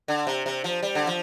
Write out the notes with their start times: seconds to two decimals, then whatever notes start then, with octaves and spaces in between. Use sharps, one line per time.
0.08 D3
0.27 C3
0.46 C3
0.64 F3
0.83 G3
0.95 D3
1.07 F3